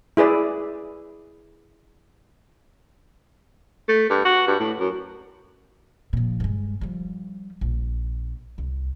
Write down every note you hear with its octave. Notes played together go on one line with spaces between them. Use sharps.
E4 G#4 B4 D5
A3
G2
F#4
G2
A2
F#2
A#2 F3
G2 G#3
F3 G3
A#1
C2